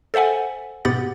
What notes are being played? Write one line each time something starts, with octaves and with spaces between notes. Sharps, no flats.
A4 C5 E5 F#5 G#5
G#2 B2 B3 G4 F#5 A6